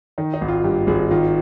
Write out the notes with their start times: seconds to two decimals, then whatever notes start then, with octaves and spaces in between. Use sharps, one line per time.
0.18 D#3 D#4
0.34 D#4
0.41 G#1
0.48 F4
0.64 G2 G4
0.87 G#1 G#4
1.11 D#3 F4